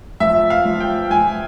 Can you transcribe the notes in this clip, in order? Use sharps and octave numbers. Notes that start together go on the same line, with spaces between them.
F3 E5
F5
F3
G5
F3 G#5